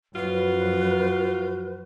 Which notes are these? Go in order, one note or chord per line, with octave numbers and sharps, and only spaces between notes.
F#2 F3 F4 F#4 B4